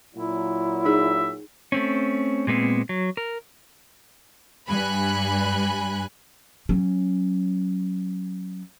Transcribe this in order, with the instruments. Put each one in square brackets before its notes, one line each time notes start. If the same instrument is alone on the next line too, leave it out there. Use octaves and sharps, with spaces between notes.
[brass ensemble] A#2 F#3 [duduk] E4
[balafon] D#4 G#4 [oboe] E5
[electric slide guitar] A3 C4 C#4
A#2 G#3 B3 C4
F#3
A#4
[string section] G2 G#5 B5 F#6
[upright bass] F#3 C#4